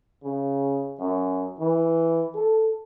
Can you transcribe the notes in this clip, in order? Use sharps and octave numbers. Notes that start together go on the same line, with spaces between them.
C#3
F#2
E3
A4